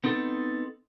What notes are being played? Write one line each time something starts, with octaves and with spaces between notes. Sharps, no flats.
B3 C4 D#4 A4